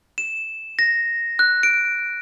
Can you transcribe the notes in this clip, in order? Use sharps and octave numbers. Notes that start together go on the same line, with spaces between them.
E7
A#6
F#6
D7